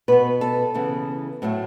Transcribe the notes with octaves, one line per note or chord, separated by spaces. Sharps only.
B2 B3 B4
A4
C#3 E3 B3
A2 F#3 A3